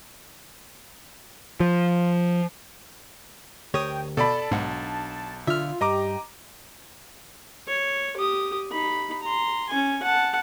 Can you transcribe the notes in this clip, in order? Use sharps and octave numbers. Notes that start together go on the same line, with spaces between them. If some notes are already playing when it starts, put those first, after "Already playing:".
F3
D2 G4 A#4 C#5 G5 D#6
B2 A4 D5 A5 B5
B1 G#2 D4 F#5
D3 F4 E5 F6
G2 G4 D#5 A#5 D6
C#5
G4 D#6
D#4 B5
A#5 C6
C#4 G#5
F#5 A5